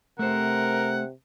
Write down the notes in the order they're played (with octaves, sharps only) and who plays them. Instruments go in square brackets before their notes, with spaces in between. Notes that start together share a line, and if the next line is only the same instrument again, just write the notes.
[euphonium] C3 [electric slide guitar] A3 C5 [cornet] A#4 [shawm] F#5